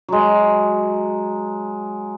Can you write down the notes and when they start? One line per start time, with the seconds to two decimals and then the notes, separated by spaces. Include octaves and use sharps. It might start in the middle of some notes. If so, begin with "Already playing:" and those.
0.09 F#3 G#3